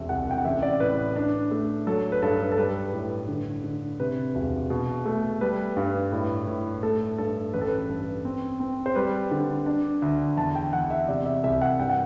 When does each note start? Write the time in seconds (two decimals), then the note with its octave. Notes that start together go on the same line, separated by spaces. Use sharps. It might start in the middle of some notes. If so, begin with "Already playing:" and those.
Already playing: E1 C4 E5
0.09 C2 F#5
0.31 G5
0.38 F#5
0.45 A1 E5
0.62 D5
0.80 A2 B4
1.16 D4
1.51 A3
1.87 F#3 A4
2.12 B4
2.22 G2 A4
2.52 A4
2.58 G3 B4
2.93 A2
3.28 D3
3.64 D3
4.00 C3 B4
4.35 E1
4.70 B2
5.06 A3
5.41 G3 B4
5.77 G2
6.12 A2
6.47 A2
6.83 A3 A4
7.18 G2 A4
7.54 A1 B4
7.61 A4
7.68 B4
7.89 G2
8.25 C4
8.60 C4
8.86 C5
8.95 G3 B4
9.31 D3
9.66 D4
10.02 D2
10.37 E2 A5
10.55 G5
10.73 E2 F#5
10.90 E5
11.08 C3 D5
11.26 E5
11.44 C2 E5
11.62 F#5
11.79 G2 G5
11.89 F#5